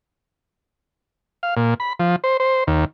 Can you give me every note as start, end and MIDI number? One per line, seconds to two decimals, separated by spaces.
1.43 1.54 77
1.57 1.74 46
1.80 1.93 83
2.00 2.16 53
2.24 2.37 72
2.40 2.64 72
2.67 2.85 39